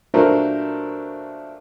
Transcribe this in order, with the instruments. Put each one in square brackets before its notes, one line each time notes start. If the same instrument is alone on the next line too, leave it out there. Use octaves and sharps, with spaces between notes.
[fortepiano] A#2 F#3 A3 D4 A#4 C5